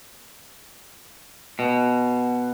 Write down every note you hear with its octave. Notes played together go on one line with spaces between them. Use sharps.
B2